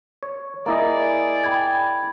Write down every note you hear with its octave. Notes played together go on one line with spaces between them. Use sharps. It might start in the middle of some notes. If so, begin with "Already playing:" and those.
C#5
A#3 E4 G#4 D5 D#5 A#5
G5 B5 G#6